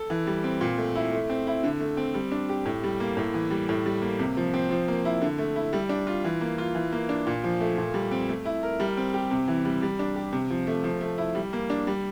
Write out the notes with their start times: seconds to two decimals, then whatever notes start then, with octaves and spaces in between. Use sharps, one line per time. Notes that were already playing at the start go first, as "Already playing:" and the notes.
Already playing: A4
0.10 E3
0.27 G3
0.44 C4
0.61 A#2
0.78 A3
0.95 E4
1.13 A3
1.30 C4
1.47 E4
1.63 D3
1.80 A3
1.97 C4
2.14 G3
2.32 D4
2.49 G4
2.65 A2
2.83 G3
3.00 A#3
3.17 A2
3.34 E3
3.50 G3
3.69 A2
3.86 G3
4.02 A#3
4.19 C3
4.37 F3
4.53 C4
4.71 F3
4.88 A#3
5.05 E4
5.22 D3
5.38 A3
5.56 E4
5.73 G3
5.89 D4
6.07 F4
6.24 E3
6.41 A#3
6.58 F4
6.75 E3
6.92 A#3
7.09 D4
7.27 A#2
7.44 F3
7.60 A3
7.78 A#2
7.94 G3
8.11 C4
8.29 A3
8.45 E4
8.63 A#4
8.80 G3
8.97 C4
9.14 G4
9.31 C3
9.48 E3
9.65 G3
9.82 G3
9.99 D4
10.16 G4
10.33 C3
10.50 F3
10.67 A3
10.84 F3
11.01 A3
11.18 E4
11.35 G3
11.53 A#3
11.70 D4
11.87 G3